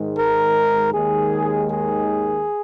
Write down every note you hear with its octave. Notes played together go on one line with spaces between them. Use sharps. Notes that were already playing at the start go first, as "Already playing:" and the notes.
Already playing: G#2 D#3 G#3
A#4
D#2 D#3 G#3 G#4
G#4